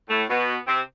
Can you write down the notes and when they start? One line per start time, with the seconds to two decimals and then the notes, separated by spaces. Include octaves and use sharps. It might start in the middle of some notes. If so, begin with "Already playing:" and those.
0.09 A2 A3
0.29 B2 B3
0.67 C3 C4